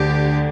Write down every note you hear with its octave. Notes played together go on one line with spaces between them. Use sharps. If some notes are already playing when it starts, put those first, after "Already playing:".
Already playing: D2 D3 G4